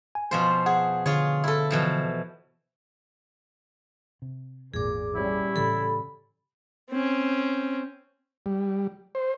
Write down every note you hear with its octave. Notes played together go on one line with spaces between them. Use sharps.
G#5
B2 F3 C5
G#4 F#5
D3 F4 G#4 C#5
E4 A4
B2 E3 F3
C3
G#1 E2 A#2 G#4 D6
G3 C#4 E4
A2 C#3 E3 A4 B5
C4 C#4
G3
C5